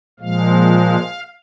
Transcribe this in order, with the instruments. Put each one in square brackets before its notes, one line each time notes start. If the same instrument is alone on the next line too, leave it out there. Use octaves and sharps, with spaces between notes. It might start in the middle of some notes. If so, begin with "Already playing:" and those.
[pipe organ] A#2 F3 G#3 F5